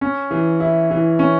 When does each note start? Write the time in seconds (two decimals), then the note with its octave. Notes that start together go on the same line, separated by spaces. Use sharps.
0.01 C#4
0.31 E3
0.60 E4
0.91 E3
1.19 C#4